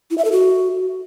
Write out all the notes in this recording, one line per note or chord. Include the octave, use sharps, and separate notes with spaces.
E4
E5
A4
F#4